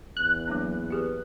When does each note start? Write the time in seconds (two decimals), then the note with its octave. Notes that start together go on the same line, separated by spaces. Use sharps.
0.17 E2 F#6
0.48 F#3 A#3 D4
0.90 G4 G#4 B4